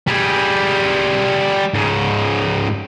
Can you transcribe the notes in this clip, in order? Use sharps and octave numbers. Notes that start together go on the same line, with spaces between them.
G3 G#4
G#2 C#3